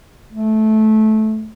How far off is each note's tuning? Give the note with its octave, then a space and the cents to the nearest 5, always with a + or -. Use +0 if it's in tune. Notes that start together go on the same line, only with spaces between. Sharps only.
A3 -15